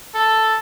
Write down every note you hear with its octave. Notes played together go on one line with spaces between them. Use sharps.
A4